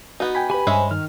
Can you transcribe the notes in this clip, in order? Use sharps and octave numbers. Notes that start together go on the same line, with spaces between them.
B3 D#4 F#4
G5 G#5 B5
G4 B4 G#5 B5
G2 G#3 C#4 C5 E5
D#3 F6